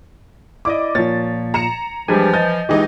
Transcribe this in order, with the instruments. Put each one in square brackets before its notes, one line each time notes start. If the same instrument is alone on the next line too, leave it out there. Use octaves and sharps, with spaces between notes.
[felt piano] E4 D5 D#5 [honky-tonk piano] D6
[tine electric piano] A#2 [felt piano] F3 C#5 [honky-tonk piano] A6
[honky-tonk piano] A#5 C#7 E7
[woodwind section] E3 F3 [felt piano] G3 D4 G4 [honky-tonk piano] G#3 [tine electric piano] G#5
[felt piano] D#5 A6 [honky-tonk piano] G6
[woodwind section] C#2 D#5 [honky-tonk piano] E3 G#3 D#4 [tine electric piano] G4